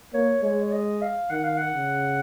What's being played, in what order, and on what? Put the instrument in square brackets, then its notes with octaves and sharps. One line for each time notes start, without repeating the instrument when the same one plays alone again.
[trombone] A#3 [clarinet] C#5
[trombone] G#3 [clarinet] C#5
[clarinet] C#5
D#5
F5
[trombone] D#3 [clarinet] F#5
[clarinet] F5
F#5
[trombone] C#3